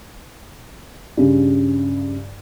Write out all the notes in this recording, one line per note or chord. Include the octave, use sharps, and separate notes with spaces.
G2 C#3